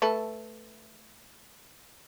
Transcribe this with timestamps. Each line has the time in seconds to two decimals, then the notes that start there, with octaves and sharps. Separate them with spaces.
0.02 A3 A4 B4